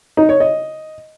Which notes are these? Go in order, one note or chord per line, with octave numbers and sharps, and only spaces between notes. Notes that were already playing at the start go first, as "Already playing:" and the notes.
D#4
C#5
D#5